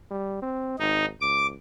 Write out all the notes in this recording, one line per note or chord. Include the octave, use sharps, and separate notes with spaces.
G3
C4
G#1 D#4
C#2 D6